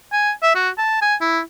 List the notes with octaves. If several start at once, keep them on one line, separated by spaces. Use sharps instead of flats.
G#5
E5
F#4
A5
G#5
E4